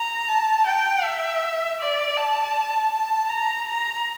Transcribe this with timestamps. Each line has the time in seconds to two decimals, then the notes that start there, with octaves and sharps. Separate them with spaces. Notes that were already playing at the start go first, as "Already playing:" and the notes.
Already playing: A#5
0.29 A5
0.67 G5
1.04 E5
1.80 D5
2.17 A5
2.92 A5
3.30 A#5
3.68 A#5